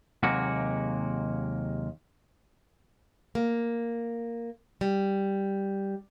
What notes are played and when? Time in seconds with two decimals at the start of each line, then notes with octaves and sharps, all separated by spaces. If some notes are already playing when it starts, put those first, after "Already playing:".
0.23 D#2 C3 F#3 G#3 A#3 F#4
3.35 A#3
4.81 G3